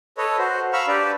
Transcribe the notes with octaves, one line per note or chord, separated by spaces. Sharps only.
A4 B4 C#5 D#5
F#4 C5
F5 A#5 B5 C#6 E6 F6
D4 G4 B4 D5